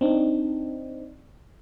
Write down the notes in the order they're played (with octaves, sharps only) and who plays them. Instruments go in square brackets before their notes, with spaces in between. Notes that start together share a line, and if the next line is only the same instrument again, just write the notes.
[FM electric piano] C4 D4 D#4